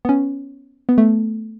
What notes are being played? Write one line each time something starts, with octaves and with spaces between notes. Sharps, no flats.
B3
C#4
B3
A3